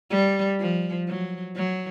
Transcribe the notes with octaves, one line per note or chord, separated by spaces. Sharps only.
G3
F3
F#3
F#3